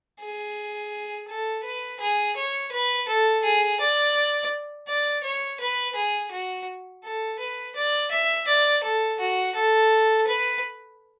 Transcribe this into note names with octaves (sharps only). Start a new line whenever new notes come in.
G#4
A4
B4
G#4
C#5
B4
A4
G#4
D5
D5
C#5
B4
G#4
F#4
A4
B4
D5
E5
D5
A4
F#4
A4
B4